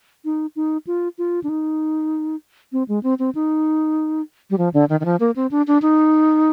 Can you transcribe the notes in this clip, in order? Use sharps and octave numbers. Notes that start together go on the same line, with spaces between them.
D#4
D#4
F4
F4
D4
D#4
C4
G#3
C4
C4
D#4
G3
F3
D3
D#3
D#3
F3
A#3
C4
D4
D4
D#4